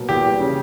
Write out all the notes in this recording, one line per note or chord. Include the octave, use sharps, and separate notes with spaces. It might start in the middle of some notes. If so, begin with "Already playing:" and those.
Already playing: B2 F#3 A#3
E2 G4
G3
C#3